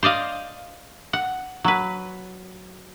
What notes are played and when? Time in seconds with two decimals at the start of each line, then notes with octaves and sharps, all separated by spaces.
0.03 C5 D5 D#5 F5
1.13 F#5
1.64 F#3 B4